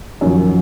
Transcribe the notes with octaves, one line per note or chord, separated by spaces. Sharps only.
F#2 D#3 F3 F#3